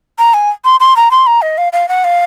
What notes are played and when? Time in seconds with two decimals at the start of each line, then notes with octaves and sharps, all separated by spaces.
0.19 A#5
0.34 G#5
0.65 C6
0.80 C6
0.96 A#5
1.11 C6
1.27 A#5
1.42 D#5
1.58 F5
1.73 F5
1.89 F#5
2.04 F5